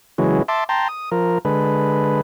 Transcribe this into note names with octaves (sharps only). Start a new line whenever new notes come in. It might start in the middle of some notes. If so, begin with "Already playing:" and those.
C#3 E3 F#3 G#3
E5 A5 C6 D6
G5 A5 A#5 C6
D#6
F3 A#4
D3 G#3 B4